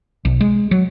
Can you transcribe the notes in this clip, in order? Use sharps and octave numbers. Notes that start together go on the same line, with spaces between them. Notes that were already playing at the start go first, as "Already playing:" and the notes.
B1
G#3
F#3